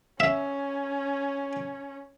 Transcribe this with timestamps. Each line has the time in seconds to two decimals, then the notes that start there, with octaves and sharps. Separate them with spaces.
0.20 C#4 E5